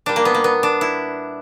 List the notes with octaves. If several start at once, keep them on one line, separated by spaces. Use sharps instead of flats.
A#2 G3 D4
A#3
B3
A#3
B3
D4
E4